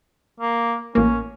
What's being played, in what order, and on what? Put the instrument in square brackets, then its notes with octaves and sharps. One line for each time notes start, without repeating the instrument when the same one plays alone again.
[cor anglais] A#3
[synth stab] A1 A#3 [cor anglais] C#4